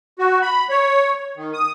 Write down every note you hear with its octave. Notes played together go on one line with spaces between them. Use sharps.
F#4
B5
C#5
D#3
D#6